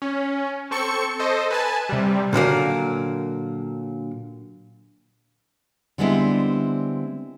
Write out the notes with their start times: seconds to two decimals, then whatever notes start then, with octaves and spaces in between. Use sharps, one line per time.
0.02 C#4
0.71 C4 A4 C#6 C#7
1.19 A4 C5 D#5
1.50 B4 G#5 A5
1.89 C3 G3
2.33 A#2 D3 F#3 A#3
5.98 D3 G3 G#3 B3 C4 E4